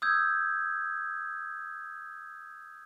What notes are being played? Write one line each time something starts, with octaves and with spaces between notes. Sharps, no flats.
D#6 E6 G6 G#6